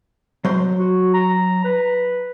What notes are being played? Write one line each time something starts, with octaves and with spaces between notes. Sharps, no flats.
F#3 C5 C6
F#4
A#5
B4